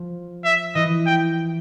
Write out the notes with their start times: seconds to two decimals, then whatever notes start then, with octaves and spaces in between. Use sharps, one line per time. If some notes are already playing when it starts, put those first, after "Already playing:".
Already playing: F3 F4
0.45 E5
0.75 E3 E4 D#5
1.06 G5